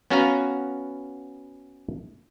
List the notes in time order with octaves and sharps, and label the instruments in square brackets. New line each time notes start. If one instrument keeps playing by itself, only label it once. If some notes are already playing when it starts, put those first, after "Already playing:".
[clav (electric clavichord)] B3 C#4 F#4 B4 F5 A#5